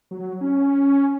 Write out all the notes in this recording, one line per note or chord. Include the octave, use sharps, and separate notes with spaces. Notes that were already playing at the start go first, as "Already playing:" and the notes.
F#3
C#4